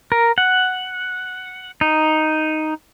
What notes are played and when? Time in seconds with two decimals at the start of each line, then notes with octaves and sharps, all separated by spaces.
0.12 A#4
0.38 F#5
1.81 D#4